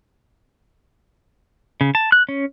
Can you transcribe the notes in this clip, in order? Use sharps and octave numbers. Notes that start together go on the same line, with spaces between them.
C#3
A5
F#6
C#4